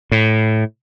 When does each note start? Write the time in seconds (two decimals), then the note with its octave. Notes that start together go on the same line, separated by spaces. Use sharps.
0.12 A2